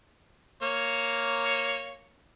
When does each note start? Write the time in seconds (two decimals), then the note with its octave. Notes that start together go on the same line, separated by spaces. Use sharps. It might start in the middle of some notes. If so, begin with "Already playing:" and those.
0.62 A#3 C#5